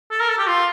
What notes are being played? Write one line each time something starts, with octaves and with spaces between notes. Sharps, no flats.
A4
A#4
A4
G4
F4